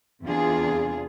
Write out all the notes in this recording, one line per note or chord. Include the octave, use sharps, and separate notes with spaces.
E2 C3 D4 F4 G#4